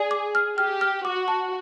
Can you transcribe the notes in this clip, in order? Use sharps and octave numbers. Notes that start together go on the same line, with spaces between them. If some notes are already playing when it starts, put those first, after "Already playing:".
Already playing: G#4 D5
D6
F6
G4 F6
F6
F#4 D6
A5